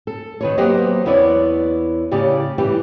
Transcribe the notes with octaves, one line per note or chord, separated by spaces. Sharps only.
A4
D#3 B4 C#5
F#3 A#3 B3 G4 C5 D#5
E2 B3 E4 C#5 D5
A2 C#3 G4 D5
E3 G3 G4